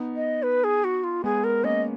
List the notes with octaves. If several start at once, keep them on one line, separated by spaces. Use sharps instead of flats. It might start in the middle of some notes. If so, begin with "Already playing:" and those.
Already playing: B3 D#4
D#5
B4
G#4
F#4
F4
G#3 B3 G#4
A#4
A#3 C#4 D#5